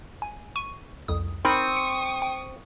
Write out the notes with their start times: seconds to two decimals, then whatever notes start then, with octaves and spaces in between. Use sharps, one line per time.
0.22 G#5
0.56 C#6 D#7
1.08 C2 F2 D#6
1.45 C4 D#4 A#4 B5 C#6 D#6
1.77 C#7
2.22 G5